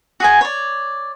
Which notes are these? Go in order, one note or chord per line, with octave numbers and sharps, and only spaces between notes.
F#4 G#4 G#5
C#5 D5